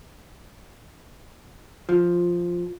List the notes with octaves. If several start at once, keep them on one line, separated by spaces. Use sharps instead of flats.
F3